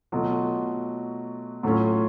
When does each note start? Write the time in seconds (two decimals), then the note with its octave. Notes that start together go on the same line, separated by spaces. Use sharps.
0.12 B2 F#3 A3 F4
1.63 A2 F#3 A3 C#4 F4